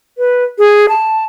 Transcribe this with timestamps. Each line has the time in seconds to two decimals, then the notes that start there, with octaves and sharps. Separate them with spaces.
0.18 B4
0.59 G#4
0.89 A5